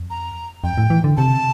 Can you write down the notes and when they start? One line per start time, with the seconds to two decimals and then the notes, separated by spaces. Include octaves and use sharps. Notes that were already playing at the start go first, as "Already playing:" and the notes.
Already playing: F2
0.10 A#5
0.63 F2 G5
0.78 A2
0.90 E3
1.04 D3
1.17 C3 A5